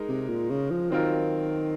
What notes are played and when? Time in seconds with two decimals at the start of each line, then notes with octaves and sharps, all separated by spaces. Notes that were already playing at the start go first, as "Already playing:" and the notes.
Already playing: G#3 D#4 A#4
0.09 C3
0.29 A#2
0.50 C#3
0.70 F3
0.90 D#3 F#3 C4 F4 A#4